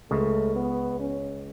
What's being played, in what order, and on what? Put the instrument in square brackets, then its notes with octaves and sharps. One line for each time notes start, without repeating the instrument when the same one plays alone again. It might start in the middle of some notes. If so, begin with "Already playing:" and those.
[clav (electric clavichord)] C#2 C#3 [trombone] A3
[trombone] B3
C#4